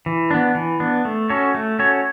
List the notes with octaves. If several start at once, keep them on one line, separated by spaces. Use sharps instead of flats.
E3
B3 D4
E3
B3 D4
A3
C#4 F#4 A4 C#5
A3
C#4 F#4 A4 C#5